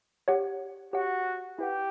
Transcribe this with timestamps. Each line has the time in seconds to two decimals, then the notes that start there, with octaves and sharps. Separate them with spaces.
0.28 G4 C#5 F#5
0.93 F#4 G4 C#5 F#5
1.59 E4 G4 B4 F#5